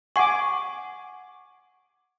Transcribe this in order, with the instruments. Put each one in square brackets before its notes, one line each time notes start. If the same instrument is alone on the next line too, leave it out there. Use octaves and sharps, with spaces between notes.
[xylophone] F#5 C#6 [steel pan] G#5 D6